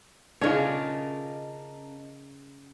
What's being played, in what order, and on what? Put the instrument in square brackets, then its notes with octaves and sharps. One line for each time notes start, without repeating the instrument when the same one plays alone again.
[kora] C#3 C#5 [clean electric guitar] C#4 A#4 D#5 [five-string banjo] D4 F4